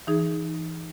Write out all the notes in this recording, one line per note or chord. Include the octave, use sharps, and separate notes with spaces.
E3 D#4 G#4